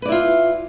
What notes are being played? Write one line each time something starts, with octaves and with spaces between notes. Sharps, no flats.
E4 F4 B4 D5